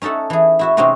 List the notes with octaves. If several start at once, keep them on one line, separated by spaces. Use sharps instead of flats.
C#4 D#4 A4 E5 F#5
E3 G#4
E4 F#4 E5
C3 G#3 C4 C#4 D#4 F#4